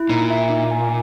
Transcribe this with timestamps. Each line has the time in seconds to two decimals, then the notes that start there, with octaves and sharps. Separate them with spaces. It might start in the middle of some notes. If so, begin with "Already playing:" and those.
Already playing: E4
0.09 A#2 D#4
0.30 E5
0.50 D#4
0.71 G#5